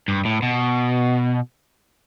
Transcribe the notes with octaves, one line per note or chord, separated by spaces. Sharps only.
G2
A2
B2